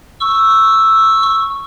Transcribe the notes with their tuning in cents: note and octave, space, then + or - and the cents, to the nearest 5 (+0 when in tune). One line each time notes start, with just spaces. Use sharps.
C#6 +0 E6 +0